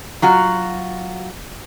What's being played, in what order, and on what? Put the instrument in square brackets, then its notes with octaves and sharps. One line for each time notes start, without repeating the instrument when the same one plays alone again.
[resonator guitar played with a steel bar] F#3 F4 F#4